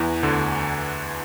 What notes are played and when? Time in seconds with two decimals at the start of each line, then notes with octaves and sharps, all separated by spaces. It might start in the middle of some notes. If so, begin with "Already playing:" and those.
Already playing: E2 E3
0.23 D2 D3